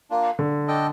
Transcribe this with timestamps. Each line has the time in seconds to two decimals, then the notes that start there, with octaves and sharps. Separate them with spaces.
0.10 A#3 D4 F4
0.39 D3
0.68 D4 A4 D#5 G5